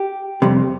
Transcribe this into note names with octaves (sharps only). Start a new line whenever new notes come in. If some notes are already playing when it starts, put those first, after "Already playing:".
Already playing: G4
F2 C3 G3